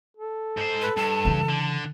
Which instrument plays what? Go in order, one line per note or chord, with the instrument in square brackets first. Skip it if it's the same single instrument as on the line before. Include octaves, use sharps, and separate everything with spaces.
[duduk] A4
[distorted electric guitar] G#2 C5
[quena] B4
[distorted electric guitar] G2 [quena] A5
[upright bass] C#3 E3
[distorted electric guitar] D3